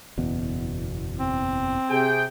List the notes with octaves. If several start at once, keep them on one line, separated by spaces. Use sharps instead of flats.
F#1 E2 B2
C4
C3 G#4 G5